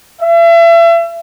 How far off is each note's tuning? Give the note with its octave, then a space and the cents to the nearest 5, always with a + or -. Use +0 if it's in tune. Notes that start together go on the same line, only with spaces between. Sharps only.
E5 +35